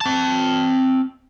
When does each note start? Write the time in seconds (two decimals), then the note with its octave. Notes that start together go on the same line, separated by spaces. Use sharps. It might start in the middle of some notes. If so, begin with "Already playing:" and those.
0.01 C4 A5